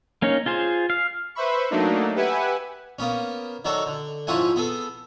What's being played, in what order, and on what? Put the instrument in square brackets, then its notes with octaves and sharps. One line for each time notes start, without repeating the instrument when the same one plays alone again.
[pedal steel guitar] A#3 C#4 D#4 C#5
F4 G#4 C5
F5
[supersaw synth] B4 C5 E5 B5 C#6
F#3 A3 A#3 D4 D#4
G4 B4 E5 F#5 G#5
[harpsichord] A#3 B3 C#4
D#3 F#3 D4 F#4 A4
D3
G#2 F3 C#4 E4 F#5 G#5
B3 G#4 A4